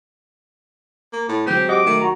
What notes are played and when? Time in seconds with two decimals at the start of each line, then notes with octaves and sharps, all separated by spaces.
1.13 A#3
1.28 A2
1.46 F#3 G#3 C4 G4
1.69 G4 D#5 F#5 D6
1.86 D#3 A3
2.01 F#4 A#5